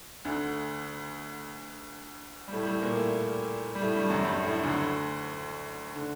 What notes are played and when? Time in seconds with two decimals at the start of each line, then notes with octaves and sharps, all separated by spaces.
0.25 D2 D3
2.48 G3
2.53 A2 A3
2.63 G3
2.67 A2 A3
2.82 A#2 A#3
2.96 A2 A3
3.75 G3
3.82 A2 A3
3.96 G2 G3
4.10 F#2 F#3
4.24 G2 G3
4.43 A2 A3
4.63 D2 D3
5.96 D3